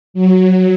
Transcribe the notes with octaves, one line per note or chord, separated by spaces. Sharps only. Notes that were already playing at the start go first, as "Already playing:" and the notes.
F#3